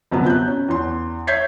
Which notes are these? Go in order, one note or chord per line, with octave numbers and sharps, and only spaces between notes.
G1 F#2 C3 F3 B3
F#6 G6
C#4
E2 C6
C#5 E5 G6 G#6 B6 C7